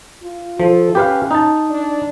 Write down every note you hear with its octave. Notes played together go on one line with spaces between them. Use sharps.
F4
F3 A4
C#4 G4 B4 F5
D#4 A5
D4